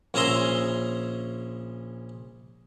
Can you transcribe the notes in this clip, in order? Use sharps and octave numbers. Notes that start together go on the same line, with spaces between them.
A#1 C#4 G#4 E5 A#5 C6